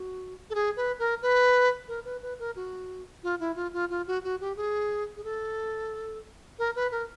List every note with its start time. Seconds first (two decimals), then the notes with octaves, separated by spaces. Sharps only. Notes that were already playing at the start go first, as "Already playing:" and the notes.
Already playing: F#4
0.50 A4
0.55 G#4
0.77 B4
0.99 A#4
1.22 B4
1.88 A#4
2.05 B4
2.22 B4
2.39 A#4
2.56 F#4
3.23 F4
3.40 E4
3.56 F4
3.73 F4
3.90 F4
4.07 F#4
4.24 F#4
4.41 G4
4.57 G#4
5.16 G#4
5.24 A4
6.59 A#4
6.76 B4
6.92 A#4